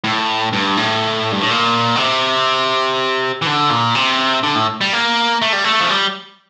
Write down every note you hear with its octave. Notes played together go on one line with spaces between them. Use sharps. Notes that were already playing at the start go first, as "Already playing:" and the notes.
A2
G2
A2
G2
A2
A#2
D3
C3
E3
D3
A#2
C3
D3
A2
G3
A#3
A3
G3
A3
F3
G3